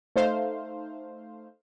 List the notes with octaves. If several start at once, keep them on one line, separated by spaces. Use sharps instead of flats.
A3 D#4 C5 F5